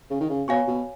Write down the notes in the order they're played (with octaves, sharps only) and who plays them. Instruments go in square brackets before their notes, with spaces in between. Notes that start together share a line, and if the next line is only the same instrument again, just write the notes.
[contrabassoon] C#3
D#3
C#3
[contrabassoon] B2 [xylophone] C#5 F5 G#5 C#6
[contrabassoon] B2